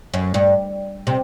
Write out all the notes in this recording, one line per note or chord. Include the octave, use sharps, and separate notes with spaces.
F#2
G2
C3